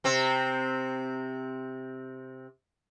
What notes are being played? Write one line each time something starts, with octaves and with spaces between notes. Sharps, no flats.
C3 C4